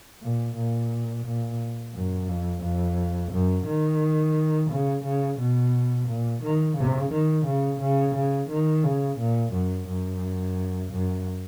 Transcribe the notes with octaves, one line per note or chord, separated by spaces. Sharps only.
A#2
A#2
A#2
F#2
F2
F2
F#2
D#3
C#3
C#3
B2
A#2
D#3
C#3
D#3
C#3
C#3
C#3
D#3
C#3
A#2
F#2
F#2
F#2